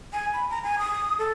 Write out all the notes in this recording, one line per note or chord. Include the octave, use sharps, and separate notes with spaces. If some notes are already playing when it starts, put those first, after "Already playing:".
G#5
B5
A#5
G#5
D#6
A4